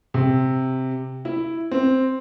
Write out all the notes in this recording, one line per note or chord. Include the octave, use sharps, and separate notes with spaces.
C3
E4
C4